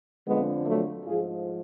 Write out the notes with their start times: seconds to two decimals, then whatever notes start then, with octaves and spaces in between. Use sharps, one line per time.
0.27 F2 D3 F3 G#3 B3
0.66 F#3 A3
1.05 G#2 F3 F4 G#4